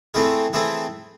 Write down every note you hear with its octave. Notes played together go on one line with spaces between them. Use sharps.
E3 A3 C4 E4 G#4
E3 A3 C4 E4 G#4